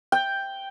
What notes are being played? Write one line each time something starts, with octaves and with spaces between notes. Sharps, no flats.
G5